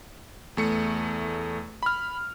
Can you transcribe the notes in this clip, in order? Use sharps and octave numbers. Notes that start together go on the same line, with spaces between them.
E2 A3 C#7
B5 F6